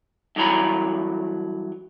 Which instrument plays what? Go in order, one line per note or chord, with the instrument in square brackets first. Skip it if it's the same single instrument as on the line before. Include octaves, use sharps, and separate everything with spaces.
[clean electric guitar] G2 E3 F#3 A#5 B5